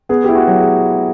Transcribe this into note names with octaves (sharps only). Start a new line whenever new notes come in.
B3 G#4
E4 G4
F#4
F#3
G#4